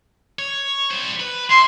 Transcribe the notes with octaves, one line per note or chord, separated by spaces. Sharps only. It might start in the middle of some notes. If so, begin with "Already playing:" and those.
C#5
G3 C5
B4
E4 C6